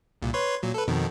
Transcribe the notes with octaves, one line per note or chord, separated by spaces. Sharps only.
C2 A#2
B4 C#5 C6
A#2 F#3
A4 B4
F2 B2 D#3